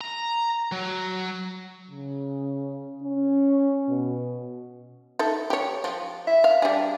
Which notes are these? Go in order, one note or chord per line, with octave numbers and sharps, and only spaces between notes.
A#5
F#3
C#3
C#4
B2
D#4 A4 E5
G4 C#5
F3
E5
F5
G3 D4 G#4